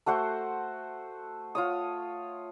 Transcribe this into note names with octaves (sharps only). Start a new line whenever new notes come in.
A3 F#4 C5 F#5
F4 C#5 D#6